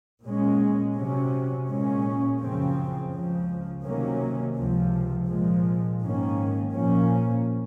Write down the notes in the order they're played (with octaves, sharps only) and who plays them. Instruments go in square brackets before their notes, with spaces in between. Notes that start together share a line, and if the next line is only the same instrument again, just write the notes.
[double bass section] A#2 G#3 C#4
C3 F#3 C#4
A#2 G#3 C#4
F#2 C#3 F3 C4
C#2 C#3 F3
C3 D#3 F#3 A#3 C#4
C#2 C3 F3
A#2 F3 G#3
G#2 D#3 A#3 C#4
A#2 F3 A#3 C#4